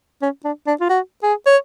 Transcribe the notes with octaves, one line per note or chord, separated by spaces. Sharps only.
C#4
D4
D4
F4
F#4
G#4
C#5